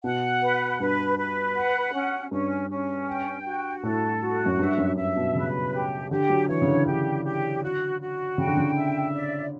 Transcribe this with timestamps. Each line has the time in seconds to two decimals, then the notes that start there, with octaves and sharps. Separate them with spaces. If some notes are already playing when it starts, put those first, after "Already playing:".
0.04 B2 F#5
0.42 B4
0.80 G2 B4
1.18 B4
1.56 F#5
1.93 C#4
2.31 G2 C#4
2.70 C#4
3.07 G5
3.45 F#4
3.83 A2 A4
4.21 F#4
4.46 F#2
4.59 G2 E5
4.78 F#2
4.96 G2 E5
5.16 B2
5.35 C#3 B4
5.73 G4
6.11 D3 G4
6.30 F#3
6.49 E3 C#5
6.62 C#3
6.68 D3
6.86 D3 G4
7.25 G4
7.63 F#4
8.01 F#4
8.38 C#3 G5
8.47 D3
8.57 C#3
8.76 E5
9.14 D5